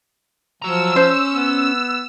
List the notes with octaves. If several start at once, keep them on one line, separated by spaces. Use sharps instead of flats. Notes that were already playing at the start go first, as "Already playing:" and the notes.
F3 F#3 A#5 E6
C#4 C5
B3